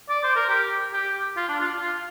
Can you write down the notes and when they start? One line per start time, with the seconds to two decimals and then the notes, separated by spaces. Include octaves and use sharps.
0.09 D5
0.23 C5
0.36 A#4
0.49 G4
0.93 G4
1.37 F4
1.49 D4
1.61 F4
1.80 F4